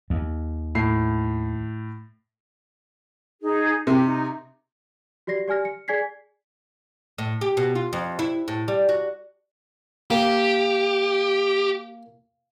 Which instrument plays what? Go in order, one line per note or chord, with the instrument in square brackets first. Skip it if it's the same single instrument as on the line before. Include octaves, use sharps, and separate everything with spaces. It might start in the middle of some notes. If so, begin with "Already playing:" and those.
[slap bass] D#2
[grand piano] A2 C7
[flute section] D#4 G#4
[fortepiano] C3 [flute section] G4
[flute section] D#4
[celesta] F#4 G4 D5 A#6 C7
G4 D5 G#5 F6 A#6
C#7
G#4 D5 G#5 G#6 B6 C7
[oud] A2
G4
B2
F4
F2
E4
A2
G3
F#4
[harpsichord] A#3 [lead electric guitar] G4